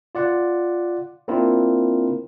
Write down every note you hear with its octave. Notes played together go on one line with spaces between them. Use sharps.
F4 D5 F#5
A#3 C4 D4 E4 F4 A#4